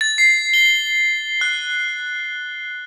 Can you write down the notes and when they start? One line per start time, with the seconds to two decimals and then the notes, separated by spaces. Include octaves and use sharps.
0.01 A6
0.18 C7
0.54 G7
1.41 F#6